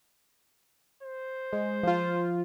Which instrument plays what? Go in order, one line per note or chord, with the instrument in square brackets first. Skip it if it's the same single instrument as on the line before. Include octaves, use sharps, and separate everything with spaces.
[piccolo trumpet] C5
[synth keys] G#3
F3 F4